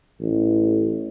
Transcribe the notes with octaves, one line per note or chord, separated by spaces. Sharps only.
A1